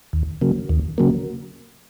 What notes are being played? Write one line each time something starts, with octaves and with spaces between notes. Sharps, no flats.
D#2
C#3 F#3 A#3
D#2
C#3 F#3 A#3